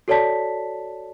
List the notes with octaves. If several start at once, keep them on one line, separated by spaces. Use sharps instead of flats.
F#4 A4 C#5 D5 A5 B6